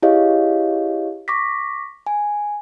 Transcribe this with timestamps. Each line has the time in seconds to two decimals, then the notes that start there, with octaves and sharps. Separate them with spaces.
0.02 E4 G4 G#4 C#5 D#5 F5
1.28 C#6 D6 A#6 B6
2.07 G#5